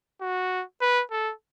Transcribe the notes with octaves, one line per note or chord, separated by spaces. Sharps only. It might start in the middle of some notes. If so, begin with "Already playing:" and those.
F#4
B4
A4